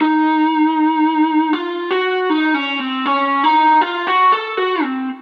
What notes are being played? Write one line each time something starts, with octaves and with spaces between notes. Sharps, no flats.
D#4
F4
F#4
D#4
C#4
C4
C#4
D#4
F4
F#4
A4
F#4
C4